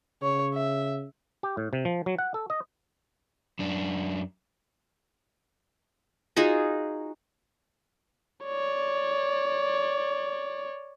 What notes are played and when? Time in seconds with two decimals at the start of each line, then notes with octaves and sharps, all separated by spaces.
0.22 C#3 C#5
0.54 E5
1.43 G4
1.57 A2
1.73 C3
1.85 F3
2.06 F#3
2.18 F#5
2.34 A4
2.50 D#5
3.59 F#2 D4
6.36 D#4 F4 F#4 G#4
8.45 C#5 D5